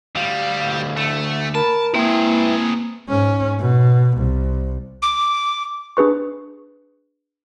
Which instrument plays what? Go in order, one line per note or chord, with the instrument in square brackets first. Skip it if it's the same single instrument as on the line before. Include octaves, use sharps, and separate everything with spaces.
[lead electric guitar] D2 F5 [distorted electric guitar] G3
[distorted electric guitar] A3
[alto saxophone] A#4 [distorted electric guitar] A5 [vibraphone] B5
[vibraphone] A#3 [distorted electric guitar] C4 G#4 [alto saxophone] E4 [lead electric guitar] B4 G5
[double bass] G#2 C#4
B2
C2
[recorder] D6
[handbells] D4 G#4 B4 C#6